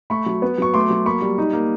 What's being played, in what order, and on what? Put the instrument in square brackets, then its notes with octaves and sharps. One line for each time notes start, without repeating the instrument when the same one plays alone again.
[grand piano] A3 B5 C#6
F#3
B3
F#3 C#6
A3 C6 D6
F#3
A#3 B5 C#6
G3
D#4
A#3